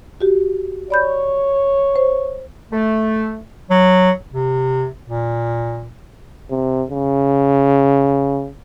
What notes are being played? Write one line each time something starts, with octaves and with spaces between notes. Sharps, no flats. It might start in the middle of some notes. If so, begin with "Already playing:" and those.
F#4 G4
C#5 D5 B5 G6
C5
A3
F#3
C3
A#2
C3
C#3